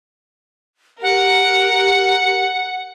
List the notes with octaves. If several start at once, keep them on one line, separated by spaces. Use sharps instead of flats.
G4 A#4 F#5